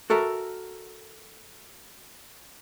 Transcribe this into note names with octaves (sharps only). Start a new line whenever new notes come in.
F#4 A4 A#4 E5